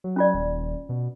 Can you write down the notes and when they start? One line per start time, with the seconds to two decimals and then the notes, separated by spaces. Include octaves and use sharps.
0.04 F#3
0.16 C#4 F4 D5
0.34 D#1
0.89 B2